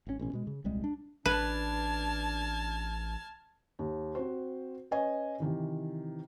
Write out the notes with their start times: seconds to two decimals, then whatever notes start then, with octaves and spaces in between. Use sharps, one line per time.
0.07 G#1 C#3 C#4
0.19 A1 B2 C#4
0.33 B2 G#3
0.47 C#3
0.64 D#1 C2 G3 G#3
0.84 D4
1.26 A1 D4 B4 A5 F6 G#6
3.79 D#2
4.15 C4 F#4 C5
4.91 C#4 B4 C#5 D#5 G#5
5.40 C3 D#3 E3